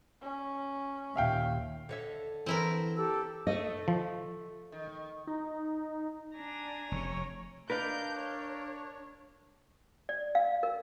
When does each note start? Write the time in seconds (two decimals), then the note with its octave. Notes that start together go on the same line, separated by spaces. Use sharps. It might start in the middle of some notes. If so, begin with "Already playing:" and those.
0.22 C#4
1.16 D#2 A#2 E5 F5 G5
1.89 D3 C#5 E5
2.46 E3 C4 E4 A#4
2.97 G4 A4 E6
3.47 A3 D#5
3.88 F3
4.72 D#3
5.27 D#4
6.36 D4 G#5 A#5
6.92 F1 C3 C#5
7.70 D4 A#4 B4 D5 D#5 F5 G6
8.19 C#5
10.09 D5
10.35 F5
10.63 A#4